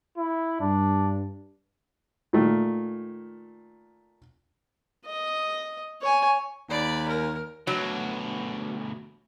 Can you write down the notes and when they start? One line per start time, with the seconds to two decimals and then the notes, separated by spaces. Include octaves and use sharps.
0.18 E4
0.61 G2 D4
2.33 A#2 D#3 A3
5.06 D#5
6.01 C#5 G#5
6.70 D#2 D5 B5
7.08 A#4
7.67 D2 B2 F#3